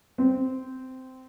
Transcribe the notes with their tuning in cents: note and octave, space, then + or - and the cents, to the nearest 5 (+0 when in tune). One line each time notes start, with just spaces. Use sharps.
C4 -15